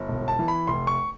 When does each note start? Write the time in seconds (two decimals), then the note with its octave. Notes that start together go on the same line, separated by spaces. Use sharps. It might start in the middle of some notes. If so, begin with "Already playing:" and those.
Already playing: G1
0.08 E1
0.28 A5
0.39 E3
0.48 B5
0.67 F1 C6
0.87 C#6